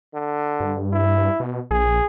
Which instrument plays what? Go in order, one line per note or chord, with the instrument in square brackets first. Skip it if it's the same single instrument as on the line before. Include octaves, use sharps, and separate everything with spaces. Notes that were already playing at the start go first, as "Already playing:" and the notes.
[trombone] D3
[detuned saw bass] G2
[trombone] E4
[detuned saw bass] B2
[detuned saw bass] A#1 [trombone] G#4